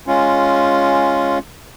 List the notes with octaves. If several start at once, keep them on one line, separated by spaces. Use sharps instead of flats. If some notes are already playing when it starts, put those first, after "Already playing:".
G#3 C#4 F4